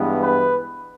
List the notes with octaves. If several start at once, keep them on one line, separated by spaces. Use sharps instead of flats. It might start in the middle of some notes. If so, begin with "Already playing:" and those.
Already playing: G2 E3 G#3 B3
B4